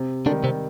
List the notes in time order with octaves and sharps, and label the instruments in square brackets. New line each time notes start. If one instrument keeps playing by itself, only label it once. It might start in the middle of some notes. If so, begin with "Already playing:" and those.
Already playing: [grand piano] C3
[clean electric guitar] D3 D4 [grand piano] D#3
[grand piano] G3
[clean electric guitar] C3 C4